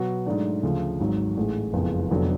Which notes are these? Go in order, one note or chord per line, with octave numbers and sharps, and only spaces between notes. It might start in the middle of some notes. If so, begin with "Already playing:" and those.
Already playing: B2 F#3 B3 F#4
G#2 F#3 A3 D4
D2 C#3 F3
G#1 G#2 F#3
A1 A2 G#3
F#1 F2 F3 G#3 B3
F1 F2 D3 F#3 B3